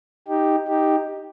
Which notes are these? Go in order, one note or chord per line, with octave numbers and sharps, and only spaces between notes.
D#4 G4
D#4 G4